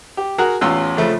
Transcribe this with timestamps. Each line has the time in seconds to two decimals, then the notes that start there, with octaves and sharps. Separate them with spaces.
0.17 G4
0.38 F#4 G#4 A#4 F#5
0.61 A1 E2 C#4 F4 C6 E6
0.97 F2 C#3 F3 A3